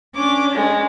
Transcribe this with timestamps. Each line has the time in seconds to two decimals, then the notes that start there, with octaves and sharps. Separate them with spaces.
0.15 C#4 D4 D6
0.55 G#3